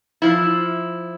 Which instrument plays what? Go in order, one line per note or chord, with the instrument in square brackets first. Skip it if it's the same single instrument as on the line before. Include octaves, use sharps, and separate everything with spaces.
[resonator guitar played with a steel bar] F3 E4